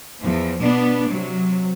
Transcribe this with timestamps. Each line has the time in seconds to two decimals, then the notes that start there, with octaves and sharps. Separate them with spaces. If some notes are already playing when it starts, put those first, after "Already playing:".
0.20 E2 F3
0.58 B2 B3 D4
1.07 C3 F#3